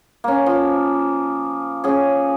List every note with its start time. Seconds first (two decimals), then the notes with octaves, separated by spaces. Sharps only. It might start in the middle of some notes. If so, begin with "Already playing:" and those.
0.24 A#3 C#4
0.46 F3
1.84 C#4 G#4